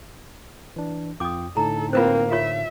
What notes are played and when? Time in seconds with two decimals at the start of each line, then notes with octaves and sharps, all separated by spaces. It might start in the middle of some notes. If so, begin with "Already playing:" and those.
0.76 E3 D4
1.20 F2 F4 G5 D6 D#6
1.57 A2 D3 D#4 A4 A#5
1.93 A#3 C4 F4 B4 C5
2.32 F4 G4 C#5 E5